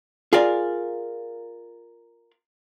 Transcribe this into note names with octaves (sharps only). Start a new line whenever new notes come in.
F4 G#4 A#4 D5 F5